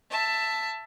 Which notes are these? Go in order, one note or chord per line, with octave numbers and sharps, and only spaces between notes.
E5 A5